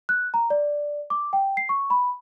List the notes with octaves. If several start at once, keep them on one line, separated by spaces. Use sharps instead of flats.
F#6
A#5
D5
D6
G5
C7
C#6
B5